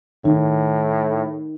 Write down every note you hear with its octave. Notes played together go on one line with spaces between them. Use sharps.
A2 D#3